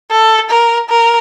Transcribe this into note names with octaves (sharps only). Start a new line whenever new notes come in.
A4
A#4
A#4